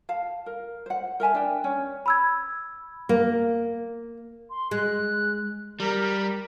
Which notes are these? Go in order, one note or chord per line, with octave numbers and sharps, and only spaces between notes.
F5 A5
A#4
C5 F#5
A#4 E5 G#5 A5
D4 G5
C#4
B5 E6 G#6
A#3
C6
G#3 F#6
G3 A#4